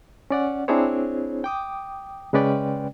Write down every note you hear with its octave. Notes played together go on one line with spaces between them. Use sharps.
C#4 D5 F#5
C4 D4 E4 G#4 C5 C#5
G5 D6 D#6
C#3 G#3 C#4 B4 D5 G5